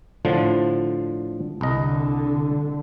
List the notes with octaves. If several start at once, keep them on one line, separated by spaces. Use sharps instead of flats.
A2 D3 F3
C2 D3 D#5